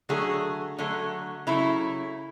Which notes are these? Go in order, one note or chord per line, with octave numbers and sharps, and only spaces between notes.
D3 F#3 A3 G#4
D3 F#3 A3
C#3 F#3 A3 E4